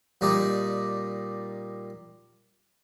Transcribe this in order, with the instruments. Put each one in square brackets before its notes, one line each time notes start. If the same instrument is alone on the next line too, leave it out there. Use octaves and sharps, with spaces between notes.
[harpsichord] A#2 G3 D#4 D5